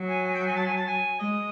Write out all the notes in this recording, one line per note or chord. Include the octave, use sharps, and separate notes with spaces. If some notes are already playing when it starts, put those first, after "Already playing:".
Already playing: F#3
G#5
G#5
G5
G#5
A5
G#5
A5
G#5
G#3 D#5